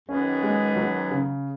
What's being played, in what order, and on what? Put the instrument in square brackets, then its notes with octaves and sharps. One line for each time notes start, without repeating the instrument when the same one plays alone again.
[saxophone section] F#2 D#3 B3 G#4 [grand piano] C#4
[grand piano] G#3
F#3
C#3